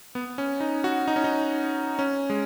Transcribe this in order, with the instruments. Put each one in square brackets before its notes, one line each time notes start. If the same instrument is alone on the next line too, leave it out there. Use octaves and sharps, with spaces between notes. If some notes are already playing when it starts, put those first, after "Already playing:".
[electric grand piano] B3
C#4
D#4
F#4
D#4
C#4
D#4
C#4
G#3